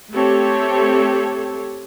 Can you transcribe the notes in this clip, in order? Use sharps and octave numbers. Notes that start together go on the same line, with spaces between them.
A3 C4 G4 A4 C#5